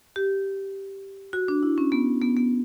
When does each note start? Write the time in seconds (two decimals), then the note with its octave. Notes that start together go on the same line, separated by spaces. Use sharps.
0.16 G4
1.33 F#4
1.48 D4
1.63 E4
1.78 C#4
1.92 B3
2.21 B3
2.37 B3